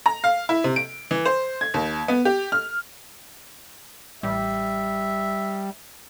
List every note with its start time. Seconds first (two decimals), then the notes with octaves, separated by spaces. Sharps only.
0.06 A#5
0.24 F5
0.49 E4
0.64 C3
0.76 D7
1.11 E3
1.25 C5
1.61 G#6
1.74 D#2
2.08 B3
2.25 G4
2.52 F6
4.23 A1 G3 E5